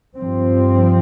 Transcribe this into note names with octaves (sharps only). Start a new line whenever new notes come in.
G2 F3 C4